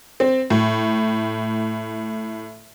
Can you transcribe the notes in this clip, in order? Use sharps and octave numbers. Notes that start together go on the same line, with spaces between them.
C4
A2